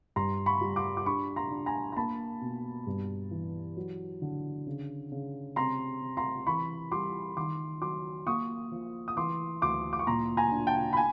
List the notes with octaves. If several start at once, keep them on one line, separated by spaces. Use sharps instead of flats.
G2 A#5 C6
B5 C#6
G3
C6 D6
D6
D4 B5 C#6
A#5 C6
D4
G#5 A#5
A#5
A#3 A5 B5
B2
G2
E3
F#3
D3
C#3
C#3
C3 A#5 C6
C3
A#5 C6
E3 B5 C#6
G3 C6 D6
D#3 C6 D6
F#3 C6 D6
A#3 C#6 D#6
F3
D#6
E3 C6 D6
D2 C6 D6
D6
C#6
A#2 A#5 C6
G#5 A#5
D4
G5 A5
B5
G#5